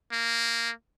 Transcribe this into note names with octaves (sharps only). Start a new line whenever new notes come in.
A#3